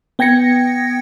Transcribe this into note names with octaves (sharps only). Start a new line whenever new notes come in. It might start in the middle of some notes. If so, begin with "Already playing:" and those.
B3 G5 G#6 A#6 C#7